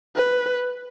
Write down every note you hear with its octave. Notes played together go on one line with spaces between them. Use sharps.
B4